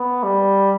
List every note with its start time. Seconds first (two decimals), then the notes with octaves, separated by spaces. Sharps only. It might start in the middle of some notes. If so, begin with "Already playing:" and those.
Already playing: B3
0.23 G3